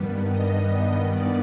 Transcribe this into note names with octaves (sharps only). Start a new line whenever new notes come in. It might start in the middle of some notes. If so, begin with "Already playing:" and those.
Already playing: G2 D#3 G3 B3
D#5
D5